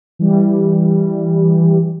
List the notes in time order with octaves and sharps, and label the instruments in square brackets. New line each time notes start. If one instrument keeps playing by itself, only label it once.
[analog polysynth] E3 G3